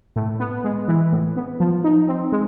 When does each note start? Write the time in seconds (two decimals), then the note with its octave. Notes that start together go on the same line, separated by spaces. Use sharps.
0.16 A2
0.40 B3
0.64 G#3
0.88 E3
1.12 A2
1.36 B3
1.60 F3
1.84 D#4
2.08 C4
2.32 G#3